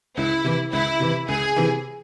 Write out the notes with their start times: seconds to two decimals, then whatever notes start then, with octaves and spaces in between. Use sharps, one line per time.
0.17 C#2 E4
0.44 C3 E3
0.73 C#2 E4
1.00 C3 E3
1.28 C#2 G#4
1.56 C3 E3